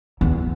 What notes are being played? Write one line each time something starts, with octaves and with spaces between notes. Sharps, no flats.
E2